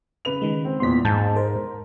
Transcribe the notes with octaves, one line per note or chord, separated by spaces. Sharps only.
C#3 B4 F7
D#3 G#3
C4
E2 A#2 B3 C6 B6
G#2 A5 G6
A#4 C5